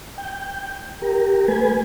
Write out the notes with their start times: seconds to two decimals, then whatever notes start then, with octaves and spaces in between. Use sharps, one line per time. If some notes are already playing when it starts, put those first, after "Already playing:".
0.18 G5
1.02 G4 A#4
1.48 A3 B4 G#5